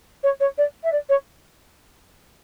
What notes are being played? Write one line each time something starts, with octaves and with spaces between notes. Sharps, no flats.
C#5
C#5
D5
E5
D5
C#5